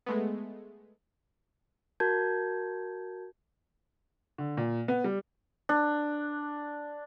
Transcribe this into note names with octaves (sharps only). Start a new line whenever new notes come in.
G#3 A3 B3
F#4 A#4 A5 G6 G#6
D3
A#2
B3
G3
D4